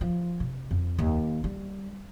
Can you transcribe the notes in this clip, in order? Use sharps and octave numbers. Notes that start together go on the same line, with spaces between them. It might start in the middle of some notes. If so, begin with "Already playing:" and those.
F3
C3
F2
D#2
G3